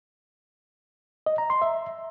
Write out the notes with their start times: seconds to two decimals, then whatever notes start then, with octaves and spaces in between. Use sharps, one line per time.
1.26 D#5
1.38 A#5
1.50 C6
1.62 E5